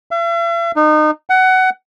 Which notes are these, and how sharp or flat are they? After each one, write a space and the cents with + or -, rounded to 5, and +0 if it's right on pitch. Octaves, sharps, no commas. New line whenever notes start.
E5 +45
D#4 -30
F#5 +20